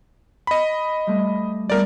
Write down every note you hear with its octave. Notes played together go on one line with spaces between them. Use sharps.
D#5 B5
G3 A3
G3 A3 B3 A#4 D5